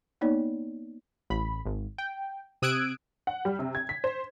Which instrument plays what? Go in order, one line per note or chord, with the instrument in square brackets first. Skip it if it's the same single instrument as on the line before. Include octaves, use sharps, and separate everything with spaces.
[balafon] A#3 B3 D#4 C#5 D5
[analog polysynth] A1 B5
G#1
G5
C3 D#6 E6 F#6 G#6 D7
[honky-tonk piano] F#5
G3
C3
G#6
B6
C5